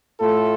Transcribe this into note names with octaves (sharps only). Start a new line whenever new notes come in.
A2 A3 F4 A4